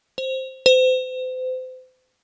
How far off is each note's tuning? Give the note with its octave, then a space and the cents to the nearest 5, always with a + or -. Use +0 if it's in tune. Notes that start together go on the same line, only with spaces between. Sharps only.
C5 +5
C5 -35